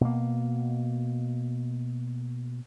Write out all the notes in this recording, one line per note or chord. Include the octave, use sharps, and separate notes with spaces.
B2 A#3